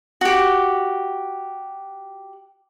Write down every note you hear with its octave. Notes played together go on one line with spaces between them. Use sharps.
F#4 G4